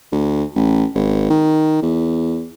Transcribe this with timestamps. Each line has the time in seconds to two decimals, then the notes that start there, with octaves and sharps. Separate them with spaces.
0.12 D2
0.56 A1
0.95 G#1
1.30 D#3
1.82 E2